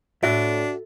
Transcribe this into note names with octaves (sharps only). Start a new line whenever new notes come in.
A2 D4 F#4 E5